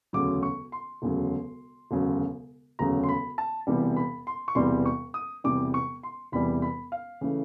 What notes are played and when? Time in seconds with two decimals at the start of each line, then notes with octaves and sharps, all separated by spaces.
0.13 E1 D2 C#3 F#3 D6
0.43 C#6
0.72 C6
1.02 E1 D2 C#3 F#3
1.91 E1 D2 C#3 F#3
2.79 E1 D2 C#3 F#3 A#5
3.03 C6
3.09 B5
3.38 A5
3.67 E1 E2 C3 E3 G3
3.97 B5
4.27 C6
4.48 C#6
4.55 E1 E2 C3 E3 G3 C6
4.86 C#6
5.14 D#6
5.44 E1 E2 C3 E3 G3 D6
5.74 C#6
6.03 C6
6.32 E1 E2 C3 E3 G3 B5
6.62 B5
6.92 F5
7.21 C#3 E3 A3